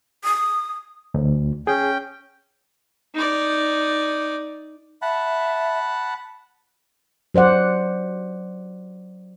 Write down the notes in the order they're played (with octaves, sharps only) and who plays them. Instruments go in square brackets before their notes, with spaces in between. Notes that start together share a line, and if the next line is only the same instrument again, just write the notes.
[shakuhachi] D#6
[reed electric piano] D2
[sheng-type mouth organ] C#4 G5 [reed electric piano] G#4
[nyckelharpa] D#4 D5
[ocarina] E5 [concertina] F#5 A5 B5
[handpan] F#3 C5 D5 F#5